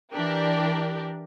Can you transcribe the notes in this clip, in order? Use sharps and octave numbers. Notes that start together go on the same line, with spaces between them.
E3 D4 G4 A#4